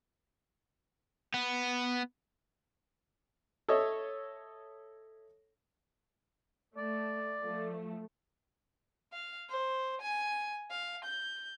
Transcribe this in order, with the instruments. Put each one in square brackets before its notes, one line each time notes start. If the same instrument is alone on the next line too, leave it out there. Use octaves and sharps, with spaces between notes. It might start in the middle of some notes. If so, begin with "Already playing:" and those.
[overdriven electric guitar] B3
[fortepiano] A4 C#5 D#5 E5
[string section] A3 [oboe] D5
[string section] F3 A3
[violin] F5
C5
G#5
F5
G6